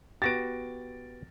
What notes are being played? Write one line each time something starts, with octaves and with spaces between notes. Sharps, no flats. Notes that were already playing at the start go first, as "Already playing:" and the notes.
B3 F#4 G4 A6 A#6 D7